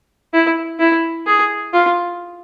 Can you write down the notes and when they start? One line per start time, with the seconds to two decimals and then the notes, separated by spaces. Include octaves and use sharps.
0.33 E4
0.79 E4
1.27 G#4
1.73 F4